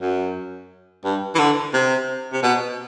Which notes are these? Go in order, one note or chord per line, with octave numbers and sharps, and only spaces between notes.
F#2
G2
E3
D3
C3
C3
B2